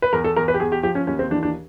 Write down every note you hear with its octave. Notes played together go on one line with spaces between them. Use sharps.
B4
E2 A#4
A4
E2 A#4
B4
G4
E2 G#4
G4
F3 G4
C#4
D#2 C#4
C4
E3 D4
D4